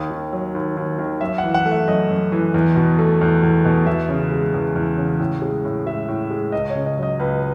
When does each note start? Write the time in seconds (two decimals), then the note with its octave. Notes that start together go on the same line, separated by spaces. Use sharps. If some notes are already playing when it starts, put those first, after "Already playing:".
Already playing: D#2 D#6
0.11 D#3
0.33 F#3
0.55 D#2
0.77 D#2
0.99 D#3
1.21 F#2 E5
1.38 F#5
1.44 E3
1.54 F#5
1.66 A3
1.71 E5
1.88 F#2 D#5
2.09 F#2
2.32 E3
2.54 E2
2.76 B2
2.99 A3
3.21 E2
3.43 E2
3.65 B2
3.87 E2 E5
4.09 C#3
4.31 G#3
4.54 E2
4.76 E2
4.97 C#3
5.19 A2
5.42 G#3
5.65 A2
5.86 G#3 E5
6.08 A2
6.31 G#3
6.52 C#2 D#5
6.70 C#5
6.75 C#3
6.86 D#5
6.98 F#3 D#5
7.20 C#2 B4